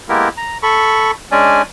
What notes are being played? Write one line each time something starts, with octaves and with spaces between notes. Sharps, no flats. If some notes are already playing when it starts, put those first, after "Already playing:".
G#3 A#3 B3 E4 G4 A#4
A#5
A4 B5 C#6
G#3 C#4 D4 D5 G#5